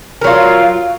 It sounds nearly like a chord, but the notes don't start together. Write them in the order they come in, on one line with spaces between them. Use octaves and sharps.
A#4 F#3 F4